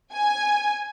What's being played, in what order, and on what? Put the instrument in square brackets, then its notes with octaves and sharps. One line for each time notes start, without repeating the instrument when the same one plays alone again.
[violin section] G#5